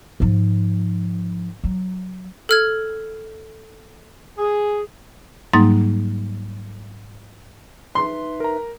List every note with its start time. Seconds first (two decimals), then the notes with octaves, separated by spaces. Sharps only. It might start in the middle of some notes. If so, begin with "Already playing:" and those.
0.20 G#2 F3
1.64 F#3
2.49 A4 F6 G#6
4.38 G#4
5.53 G#2 F#3 G3 A#3 D#4 A6
7.95 D#4 B4 E5 C6
8.40 A#4 A#5